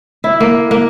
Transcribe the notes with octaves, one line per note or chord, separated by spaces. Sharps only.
E4
A#3
A#3